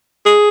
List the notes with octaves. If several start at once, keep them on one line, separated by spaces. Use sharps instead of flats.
G#4